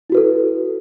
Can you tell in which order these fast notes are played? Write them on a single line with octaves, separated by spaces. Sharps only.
E4 F#4 B4 A4